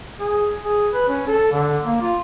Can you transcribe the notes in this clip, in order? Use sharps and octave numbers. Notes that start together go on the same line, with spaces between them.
G#4
G#4
B4
C#4
A4
D3
A#3
F4